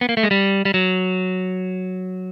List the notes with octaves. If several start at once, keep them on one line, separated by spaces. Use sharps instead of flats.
B3
A#3
A3
G#3
G3
G3
F#3